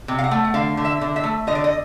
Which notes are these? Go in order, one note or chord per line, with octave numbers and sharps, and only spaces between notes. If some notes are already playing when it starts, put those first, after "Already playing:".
C3
F5
F#5
A3
F#5
D3 F5
D3
E5
D3
E5
A3
D3 D#5
D5
D#5